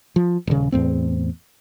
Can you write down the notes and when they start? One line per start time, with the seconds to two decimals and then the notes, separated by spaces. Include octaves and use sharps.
0.16 F3
0.47 D#1 C#3
0.72 E2 A2 C4